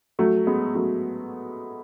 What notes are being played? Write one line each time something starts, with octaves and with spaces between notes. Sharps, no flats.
F#3 A3
G#3 B3
F#3 A3